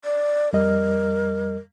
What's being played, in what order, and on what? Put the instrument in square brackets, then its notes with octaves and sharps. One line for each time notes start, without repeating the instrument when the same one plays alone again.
[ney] D5
[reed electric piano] F2 G3 D#5 [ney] A#4